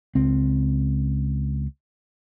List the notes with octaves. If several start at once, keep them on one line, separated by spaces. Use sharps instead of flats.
C#2 C4